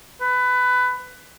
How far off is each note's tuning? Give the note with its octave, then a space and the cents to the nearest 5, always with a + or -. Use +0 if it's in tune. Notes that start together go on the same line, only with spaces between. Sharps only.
B4 +20